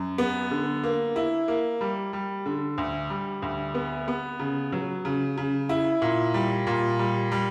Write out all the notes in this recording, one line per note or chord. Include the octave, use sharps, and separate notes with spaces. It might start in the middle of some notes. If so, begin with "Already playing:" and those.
Already playing: F#2
B3
D3
A#3
E4
A#3
G3
G3
D3
D2
G3
D2
B3
B3
C#3
F#3
C#3
C#3
E4
A#2
G3
A#2
G3
G3